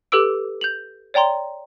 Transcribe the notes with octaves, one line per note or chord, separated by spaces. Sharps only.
G4 A4 B4 D6 E6 D7
G6 F7 F#7
C#5 D5 G5 A#5 C6